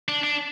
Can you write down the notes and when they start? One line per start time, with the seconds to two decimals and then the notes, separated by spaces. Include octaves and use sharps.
0.08 D4
0.23 D4